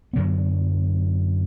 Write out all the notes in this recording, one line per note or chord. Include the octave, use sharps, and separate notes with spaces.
F#2 D3 F#3 B3